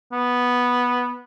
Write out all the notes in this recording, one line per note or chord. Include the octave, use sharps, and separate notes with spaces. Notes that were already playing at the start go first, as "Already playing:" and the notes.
B3